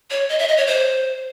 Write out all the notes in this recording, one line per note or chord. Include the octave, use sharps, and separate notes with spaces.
C#5
D#5
E5
D#5
C#5
C5